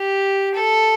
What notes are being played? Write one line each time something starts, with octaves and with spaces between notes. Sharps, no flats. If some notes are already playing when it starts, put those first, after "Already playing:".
Already playing: G4
A4